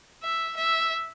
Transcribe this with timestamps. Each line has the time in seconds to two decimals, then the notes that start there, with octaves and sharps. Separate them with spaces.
0.22 E5
0.56 E5